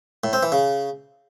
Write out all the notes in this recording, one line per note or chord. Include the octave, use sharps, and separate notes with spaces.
A2
C4
E3
C#3